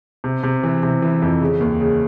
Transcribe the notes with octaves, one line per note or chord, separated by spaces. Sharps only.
C3
C3
E3
C3
E3
F2
C#3
D#2
C#3